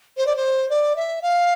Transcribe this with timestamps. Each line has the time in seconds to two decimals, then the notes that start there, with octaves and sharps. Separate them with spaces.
0.17 C5
0.26 D5
0.36 C5
0.70 D5
0.96 E5
1.22 F5